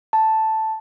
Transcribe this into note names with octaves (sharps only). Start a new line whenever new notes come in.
A5